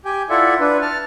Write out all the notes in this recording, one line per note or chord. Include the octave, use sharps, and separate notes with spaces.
G4 G5 G#5
E4 F4 A4 D5 E5 F#5
D4 B4
A5 F6